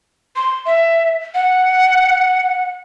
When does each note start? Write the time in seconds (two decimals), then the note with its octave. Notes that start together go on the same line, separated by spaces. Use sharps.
0.36 C6
0.66 E5
1.35 F#5